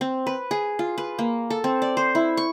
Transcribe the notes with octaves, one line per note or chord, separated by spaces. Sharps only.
C4
B4
G#4
F4
B4
A#3
A4
C4
D5
C5
E4
C#6